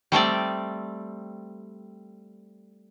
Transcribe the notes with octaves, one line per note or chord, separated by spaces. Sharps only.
G3 A3 C4 D5